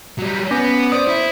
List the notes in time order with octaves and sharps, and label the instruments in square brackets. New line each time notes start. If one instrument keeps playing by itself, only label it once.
[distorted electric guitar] F#3 G3
[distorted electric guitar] B3 [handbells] C#4
[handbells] C5 D#6 [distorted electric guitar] D5
[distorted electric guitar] E4